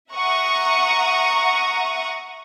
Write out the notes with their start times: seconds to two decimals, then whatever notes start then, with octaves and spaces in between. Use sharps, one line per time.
0.12 E5 F#5 A#5 C#6 D#6